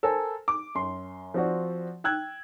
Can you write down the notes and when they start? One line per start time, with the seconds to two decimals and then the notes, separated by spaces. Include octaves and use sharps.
0.03 A4 A#4 C5 G#5
0.48 D6
0.75 F#2 C6
1.34 F3 C4 F#4 D5
2.04 G5 E6 F#6 G#6